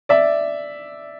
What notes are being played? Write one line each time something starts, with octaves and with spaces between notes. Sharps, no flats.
D5 E5